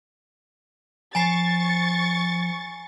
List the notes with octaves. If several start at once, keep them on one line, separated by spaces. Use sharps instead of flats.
F3 G#5 A#5 C#6 A6 C7